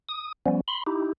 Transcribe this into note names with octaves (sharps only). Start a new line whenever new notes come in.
D#6
F3 G3 B3 C#4
B5 C6
D#4 E4 G4